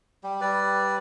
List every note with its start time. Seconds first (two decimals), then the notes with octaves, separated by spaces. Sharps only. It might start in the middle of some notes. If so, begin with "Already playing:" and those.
0.23 G3 G4
0.41 G3 B4 D5